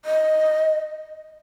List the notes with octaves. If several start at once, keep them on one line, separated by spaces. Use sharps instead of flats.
D#5